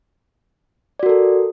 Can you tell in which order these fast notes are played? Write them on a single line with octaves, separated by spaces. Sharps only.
D5 F#4 A#4 A4